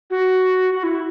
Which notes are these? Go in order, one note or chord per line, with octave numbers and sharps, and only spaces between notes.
F#4
F#4
E4